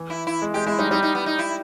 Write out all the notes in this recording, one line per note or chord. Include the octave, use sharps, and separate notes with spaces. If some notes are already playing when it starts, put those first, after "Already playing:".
Already playing: E3
E4
E4
G#3
G#3 G4
G#3 E4
G3 D#4
G3 D#4
D#4
B3
D#4
E4